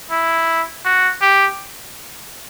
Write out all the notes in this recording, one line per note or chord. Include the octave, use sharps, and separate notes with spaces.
E4
F#4
G4